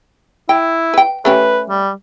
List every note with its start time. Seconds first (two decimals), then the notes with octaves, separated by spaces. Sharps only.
0.49 E4 G5
0.94 B4 G5
1.25 A3 C#4 G4 B4
1.69 G3